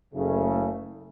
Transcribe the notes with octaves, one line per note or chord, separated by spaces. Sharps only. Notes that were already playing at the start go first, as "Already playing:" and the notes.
F#1 C#3 A3